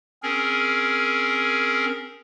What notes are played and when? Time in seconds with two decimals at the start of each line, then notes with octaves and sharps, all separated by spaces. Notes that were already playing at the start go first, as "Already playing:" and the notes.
0.23 C4 C#4 G#4 A#4